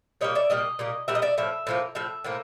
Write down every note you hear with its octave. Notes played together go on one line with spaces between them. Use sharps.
A#2 G3 A#3 C#5 D#5
D5 E5
A#2 G3 A#3 D#5
A#2 G3 A#3
A#2 G3 E5
D#5
D5 E5
A2 F3 E5
A2 F3 A#3
A2 F3 E5
A2 F3 A#3